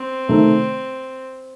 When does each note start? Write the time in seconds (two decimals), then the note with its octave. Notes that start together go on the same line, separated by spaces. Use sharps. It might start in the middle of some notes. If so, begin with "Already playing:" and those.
Already playing: C4
0.28 C3 D#3 A3 D#4